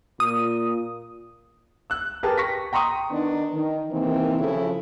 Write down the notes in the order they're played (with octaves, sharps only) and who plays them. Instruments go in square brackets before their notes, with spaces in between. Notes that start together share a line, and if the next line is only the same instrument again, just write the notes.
[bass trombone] A#2 [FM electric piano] D#6
[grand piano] E6 F#6
G4 G#4 A#4 B4 A5
C#6 A#6 B6
G5 A#5 C6 C#6 D#6
[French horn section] D#3 B3 D4 D#4
D#3
C3 D#3 E3 A#3 C4
C#3 F3 E4 A4